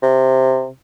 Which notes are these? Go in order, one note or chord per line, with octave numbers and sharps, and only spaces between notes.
C3